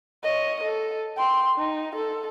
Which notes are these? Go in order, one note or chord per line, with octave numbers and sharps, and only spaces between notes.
C#5 D#5
A4
G5 C6
D#4
A4